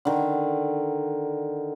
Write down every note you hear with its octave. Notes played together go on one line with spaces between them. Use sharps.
D3 D#3